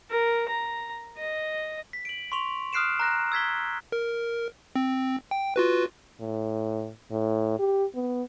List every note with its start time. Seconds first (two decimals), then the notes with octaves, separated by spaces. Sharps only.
0.10 A#4
0.49 A#5
1.18 D#5
1.93 B6
2.05 D7 F#7
2.32 C6 C#6 F7
2.73 D#6 F6 F#6 C7 D7 E7
3.00 A#5 F#6 A#6
3.32 E6 G#6 B6 G7
3.92 A#4
4.76 C4
5.31 G5
5.56 F4 F#4 B4
6.20 A2
7.12 A2
7.59 G4
7.95 B3